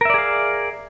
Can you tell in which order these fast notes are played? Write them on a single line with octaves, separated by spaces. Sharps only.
A#4 E5 D5 G#4 F5